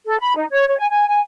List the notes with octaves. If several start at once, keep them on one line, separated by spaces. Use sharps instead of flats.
A4
B5
D#4
C#5
C#5
G#5
G#5
G#5